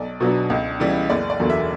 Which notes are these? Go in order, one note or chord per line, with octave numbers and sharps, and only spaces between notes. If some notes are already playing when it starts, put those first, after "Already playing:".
Already playing: B1 D5
B2 F#3 B3 D4
C#2
C#3 E3 G3
F#1 D5
D5
E2 D3 F#3 A#3
E5